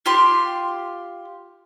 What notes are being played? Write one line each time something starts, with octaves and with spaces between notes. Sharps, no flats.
F4 G4 C6